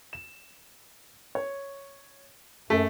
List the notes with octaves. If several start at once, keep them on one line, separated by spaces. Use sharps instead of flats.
E7
C#5
F#2 A3 A4